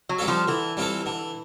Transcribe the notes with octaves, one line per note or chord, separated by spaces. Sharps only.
F#3
G3 C4 F4 A4
F3
D3 E3
G3 C4 F4 A4
D3